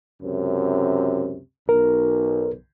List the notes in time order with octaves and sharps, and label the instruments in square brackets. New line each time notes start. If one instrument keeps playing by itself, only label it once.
[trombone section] C#2 F#2 C3
[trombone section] B1 [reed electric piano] A#4